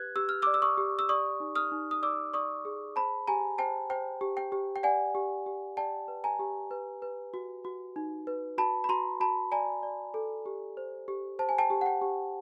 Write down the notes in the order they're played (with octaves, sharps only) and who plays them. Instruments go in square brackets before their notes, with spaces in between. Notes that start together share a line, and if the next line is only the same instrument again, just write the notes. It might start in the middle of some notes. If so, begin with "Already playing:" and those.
Already playing: [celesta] G4 B4 F#6 G#6
G4 E6
F6
D5 D6 E6
E6
C#6 D#6
G4
E6
D5 C#6 D#6
D#4
D#6 F6
D#4
D#6
D5 D6 E6
D5 C#6 D#6
G#4
C5 A5 B5
G4 G#5 A#5
C5 G5 A5
C5 G5
G4
G5
G4
G5
D5 F#5 G#5
G4
G4
D5 G5 A5
B4
G#5 A#5
G4
B4
B4
F#4
F#4
D#4
B4
F#4 A5 B5
B5
F#4 A#5 C6
F#4 A5 B5
D5 G#5 A#5
D5
A4
G4
C5
G4
C5 A5
G#5
G5 A5
G4
F#5
G5
G4